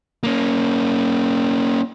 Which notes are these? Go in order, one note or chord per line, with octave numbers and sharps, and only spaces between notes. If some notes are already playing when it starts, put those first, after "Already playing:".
A#3 C#4